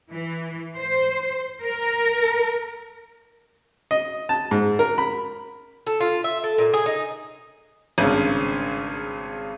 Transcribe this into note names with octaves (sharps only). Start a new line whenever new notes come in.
E3
C5
A#4
D#5
A5
G#2
A#4
B5
A4
F4
E5
A4
A#2
G#4
D#4
G#1 G2 C#3